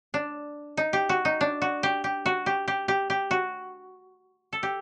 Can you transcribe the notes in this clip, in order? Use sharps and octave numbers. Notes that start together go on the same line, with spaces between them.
D4
D#4
G4
F#4
D#4
D4
F#4
G4
G4
F#4
G4
G4
G4
G4
F#4
A4
G4